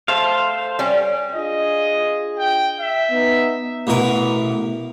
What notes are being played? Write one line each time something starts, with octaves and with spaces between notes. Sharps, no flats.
A3 C5 F5
G3 C#4
D4 F4 G#4 D#5
G5
E5
B3 D#4
A1 B2 A#4